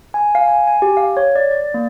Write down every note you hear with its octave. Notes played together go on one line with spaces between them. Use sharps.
G#5
F5
G#5
G#5
G4
F5
C#5
D5
D5
A#3